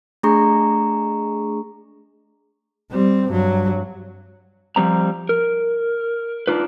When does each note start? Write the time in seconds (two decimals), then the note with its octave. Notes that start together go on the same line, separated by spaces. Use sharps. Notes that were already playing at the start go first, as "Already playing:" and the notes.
0.23 A3 D4 G#4 A#5 C#6
2.91 G3 C4
3.28 G2 F#3
4.76 F3 G3 C4 A#5
5.29 A#4
6.47 D4 D#4 F4 B4